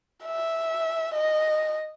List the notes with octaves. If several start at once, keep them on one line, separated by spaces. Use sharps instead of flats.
E5
D#5